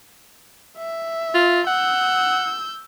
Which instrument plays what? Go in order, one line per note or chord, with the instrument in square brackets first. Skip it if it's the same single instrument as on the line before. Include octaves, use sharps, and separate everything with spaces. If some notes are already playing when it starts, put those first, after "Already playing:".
[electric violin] E5
[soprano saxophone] F4
[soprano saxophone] F#5 [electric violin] E6 G6